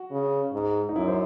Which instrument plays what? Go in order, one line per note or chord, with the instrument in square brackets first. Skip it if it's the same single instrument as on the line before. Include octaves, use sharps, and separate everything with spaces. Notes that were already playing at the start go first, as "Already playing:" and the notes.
Already playing: [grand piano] F#4
[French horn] C#3
G#2
[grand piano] D#4
[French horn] F#2 [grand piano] E4
[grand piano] C5